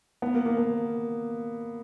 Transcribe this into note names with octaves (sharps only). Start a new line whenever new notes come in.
B3
A#3
A#3
B3